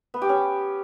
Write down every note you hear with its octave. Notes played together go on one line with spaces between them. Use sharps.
B3
G4
C#4